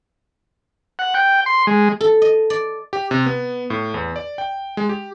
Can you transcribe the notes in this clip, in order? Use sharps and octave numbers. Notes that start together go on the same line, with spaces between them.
F#5
G5
C6
G#3
A4
D#5
D5
G4
C3
B3
A2
E2
D5
G5
G#3
G4